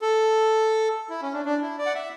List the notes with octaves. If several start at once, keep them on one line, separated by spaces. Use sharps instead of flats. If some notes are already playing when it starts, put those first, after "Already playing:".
A4
E4
C#4
D4
D4
E4
D5
F#5
E5